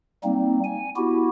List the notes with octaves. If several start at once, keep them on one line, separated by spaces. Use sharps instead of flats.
G3 A#3 C4 D#4
G#5
B3 E4 F#4 G4